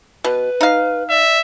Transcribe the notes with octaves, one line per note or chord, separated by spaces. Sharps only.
B2 B4
D#4 F5
D5 E5